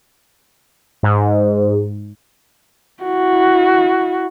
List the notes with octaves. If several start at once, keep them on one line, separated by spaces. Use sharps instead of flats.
G#2
E4 F#4